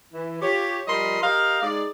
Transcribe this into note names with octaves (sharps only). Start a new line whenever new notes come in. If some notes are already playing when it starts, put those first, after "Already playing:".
E3
F4 G4 C#5
F3 G3 A#4 D#5 B5 C6
G4 A#4 D#5 F5
G#3 D#4 G#4 D5